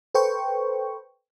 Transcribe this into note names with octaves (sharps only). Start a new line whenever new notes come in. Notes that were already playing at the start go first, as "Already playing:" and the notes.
A4 B4 C5 G5 C#6